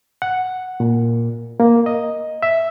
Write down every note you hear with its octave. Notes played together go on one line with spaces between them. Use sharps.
F#5
A#2
A#3
D#5
E5